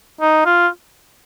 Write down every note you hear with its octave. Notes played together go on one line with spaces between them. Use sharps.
D#4
F4